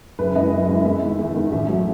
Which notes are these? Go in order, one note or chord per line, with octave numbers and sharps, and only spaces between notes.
F#1 B4
F#2 E3 G#3 D#5
F#1
F#2 E3 G#3
E2 E5
D#3 G#3
E2
D#3 G#3
A1 E5
A2 F#3